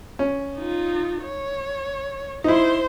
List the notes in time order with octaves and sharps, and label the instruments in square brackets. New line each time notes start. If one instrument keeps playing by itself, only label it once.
[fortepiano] C#4
[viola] D#4 F4
C#5
[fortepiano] D#4 E4 [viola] C5 C6